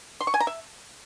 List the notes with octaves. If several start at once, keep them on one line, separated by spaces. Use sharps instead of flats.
C6
C#6
G#5
A#5
E5